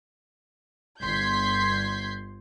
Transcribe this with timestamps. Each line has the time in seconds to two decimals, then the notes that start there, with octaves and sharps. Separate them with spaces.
1.01 G1 C6 G6 G#6 B6